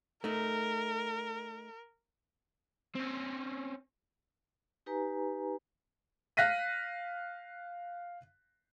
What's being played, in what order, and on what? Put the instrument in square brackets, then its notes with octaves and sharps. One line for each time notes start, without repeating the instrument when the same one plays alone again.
[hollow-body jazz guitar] A3 D#4 [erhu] A#4
[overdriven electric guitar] C4 C#4
[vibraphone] D#4 G4 B4 G#5 A#5
[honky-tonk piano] F5 F#6 A#6 B6 D#7